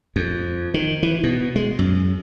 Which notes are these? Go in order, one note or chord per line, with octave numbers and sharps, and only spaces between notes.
F2
D#3
E3
B2
G#3
F#2